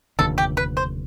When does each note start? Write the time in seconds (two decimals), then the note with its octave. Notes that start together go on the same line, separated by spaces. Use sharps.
0.19 F1 D#2 D3 A4
0.38 G4
0.57 B4
0.77 C5